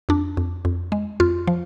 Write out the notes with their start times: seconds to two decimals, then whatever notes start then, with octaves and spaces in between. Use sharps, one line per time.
0.09 F2 D4
0.37 F2
0.65 F2
0.92 G#3
1.20 F2 F4
1.47 F3